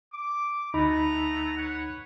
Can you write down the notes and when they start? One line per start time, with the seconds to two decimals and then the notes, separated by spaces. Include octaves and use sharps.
0.13 D6
0.74 D2 A3 B3 D#4 A#5 B5
1.58 B4 C#5 F#5